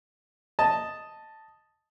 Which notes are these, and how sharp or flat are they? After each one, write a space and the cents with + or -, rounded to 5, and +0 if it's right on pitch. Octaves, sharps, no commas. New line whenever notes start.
D#5 +0 A5 +0